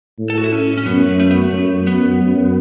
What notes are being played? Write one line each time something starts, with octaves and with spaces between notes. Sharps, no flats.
A2
A4
F#4
E4
C#4
C#4
F#2 B3
A3
A3
B3
A3
F#2
F#2 B3
F#2